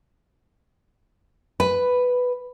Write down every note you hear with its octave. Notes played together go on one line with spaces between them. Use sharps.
B4